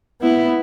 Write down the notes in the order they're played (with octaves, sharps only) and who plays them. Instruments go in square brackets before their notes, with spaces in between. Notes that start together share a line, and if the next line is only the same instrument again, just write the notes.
[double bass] B3 [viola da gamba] E4